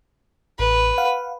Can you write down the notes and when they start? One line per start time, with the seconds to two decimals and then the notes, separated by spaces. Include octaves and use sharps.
0.59 A1 B4
0.98 F5 F#5